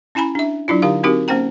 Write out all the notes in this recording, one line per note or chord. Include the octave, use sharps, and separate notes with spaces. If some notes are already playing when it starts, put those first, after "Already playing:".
C#4 E4 G#5 A#5 B5
D4 E5
F#3 D4 E4 F4
D3 D#4 G4 F5
C4 D#4 F#4 G4 A#4
A#3 C#4 C5 G5 A#5